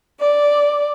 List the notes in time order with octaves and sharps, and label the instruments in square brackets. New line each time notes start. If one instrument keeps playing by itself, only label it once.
[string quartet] D5